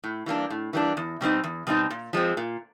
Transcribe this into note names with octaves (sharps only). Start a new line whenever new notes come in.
A2
E3 G3 A#3 D4
A2
E3 G3 A#3 D4
E2
B2 G3 C4 D#4
E2
B2 G3 C4 D#4
A#2
F3 G#3 C4
A#2